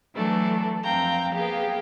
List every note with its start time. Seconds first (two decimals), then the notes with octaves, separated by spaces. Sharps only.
0.15 E3 F#3 A3 D4 A4
0.83 F2 C4 F5 G5 A#5 G6
1.32 A#3 B3 G4 G#4 F5 G5